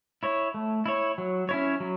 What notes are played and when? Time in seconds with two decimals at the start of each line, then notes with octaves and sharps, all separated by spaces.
0.23 E4 C#5
0.54 A3
0.86 E4 C#5
1.18 F#3
1.49 C#4 E4 C#5
1.80 F#3